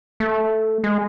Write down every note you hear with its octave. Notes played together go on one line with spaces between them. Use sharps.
A3
G#3